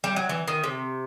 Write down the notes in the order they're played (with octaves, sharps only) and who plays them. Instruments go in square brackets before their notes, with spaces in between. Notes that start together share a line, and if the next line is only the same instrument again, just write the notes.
[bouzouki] G3
F#3
E3
D#3
C3